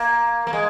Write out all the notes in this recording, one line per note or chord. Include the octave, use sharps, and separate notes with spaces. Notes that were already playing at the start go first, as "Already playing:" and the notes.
Already playing: A#3
A#3
G#3